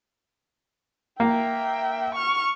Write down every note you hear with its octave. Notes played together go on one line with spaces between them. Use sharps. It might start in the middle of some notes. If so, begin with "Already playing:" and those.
A#3 E5 G5
C#6 F6